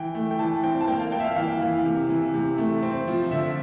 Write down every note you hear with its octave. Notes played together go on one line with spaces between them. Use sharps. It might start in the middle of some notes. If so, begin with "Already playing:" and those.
Already playing: E3 G5
A3
G5
E3 A5
C4 G5
A5
A#3 G5
F5
A#3 G5
E5
F5
E3 F5
E3
C3
E3
C3
A3
C4
F3
D3 E5